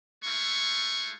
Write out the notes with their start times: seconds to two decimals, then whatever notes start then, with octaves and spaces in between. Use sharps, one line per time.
0.24 G#3 A3 E4 F4 C#6